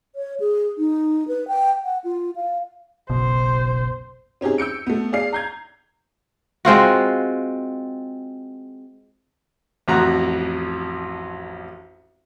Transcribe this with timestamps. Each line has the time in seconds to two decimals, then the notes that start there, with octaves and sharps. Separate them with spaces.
0.15 C#5
0.40 G#4
0.78 D#4
1.28 B4
1.48 G5
1.84 F#5
2.04 F4
2.36 F5
3.10 F#1 B1 B2 C5
4.41 C4 C#4 D#4 G4 G#4
4.58 E6 G6 C#7 D7
4.87 A3 B3
5.12 D4 G#4 D5 F5 C7
5.33 A#5 G6 G#6
6.65 G#3 C4 F4 F#4
9.88 A1 F2 F#4 A#5 F#6